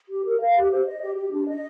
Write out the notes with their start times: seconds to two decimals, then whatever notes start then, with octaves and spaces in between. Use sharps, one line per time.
0.09 G4
0.25 A#4
0.40 F5
0.56 G4
0.71 C5
0.86 D#5
1.01 G4
1.17 G4
1.32 D4
1.48 D#5